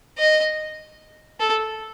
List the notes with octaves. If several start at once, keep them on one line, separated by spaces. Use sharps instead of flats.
D#5
A4